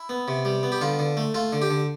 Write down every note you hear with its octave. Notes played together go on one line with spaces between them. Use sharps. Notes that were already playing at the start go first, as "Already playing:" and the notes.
Already playing: E4
B3
C3
G3
B3
G4
D3 F4
D3
A3
A3 F4
D3
G4
D3